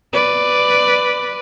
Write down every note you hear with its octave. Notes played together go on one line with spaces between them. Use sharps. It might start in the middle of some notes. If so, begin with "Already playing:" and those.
B4 D5